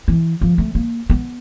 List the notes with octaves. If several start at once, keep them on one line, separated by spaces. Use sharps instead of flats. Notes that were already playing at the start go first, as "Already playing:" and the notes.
E3
F3
A3
A#3
B3